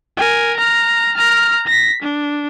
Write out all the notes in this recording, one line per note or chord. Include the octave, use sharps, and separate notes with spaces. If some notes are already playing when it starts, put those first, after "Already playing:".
A#4 G#5
A#5 F6
A#5 F6
A#6 B6
D4